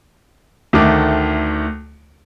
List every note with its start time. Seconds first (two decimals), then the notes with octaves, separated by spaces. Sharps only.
0.73 D2 D#3 A3 D6